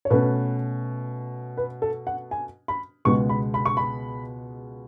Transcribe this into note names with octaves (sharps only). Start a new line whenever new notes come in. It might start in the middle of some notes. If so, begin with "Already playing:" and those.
C#5
B2 A3 C#4 B4
B4
A4
F#5
G#5
B5
C#2 B2 G#3 B3 C#6
B5
B5
C#6
B5